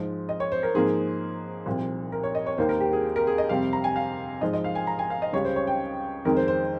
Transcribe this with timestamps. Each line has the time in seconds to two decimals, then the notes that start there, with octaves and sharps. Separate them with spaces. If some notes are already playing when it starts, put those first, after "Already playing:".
Already playing: G#2 F3 G#3
0.29 D#5
0.40 C#5
0.52 C5
0.63 A#4
0.75 G#2 F3 A#3 G#4
1.66 C2 A#2 F3
2.12 A#4
2.23 C#5
2.35 D#5
2.46 C#5
2.58 D#2 D#3 A#3 C5
2.69 A#4
2.80 G4
2.93 G#4
3.16 A#4
3.27 G#4
3.38 D#5
3.49 F2 C3 G3 F5
3.73 A#5
3.84 G#5
3.96 F5
4.41 G#2 F3 G#3 D#5
4.53 D#5
4.64 F5
4.75 G#5
4.87 A#5
4.99 G#5
5.10 F5
5.22 D#5
5.33 C#2 C#3 G3 C#5
5.45 C5
5.56 C#5
5.67 G5
6.25 F2 D#3 G#3 A#4
6.37 C5
6.48 C5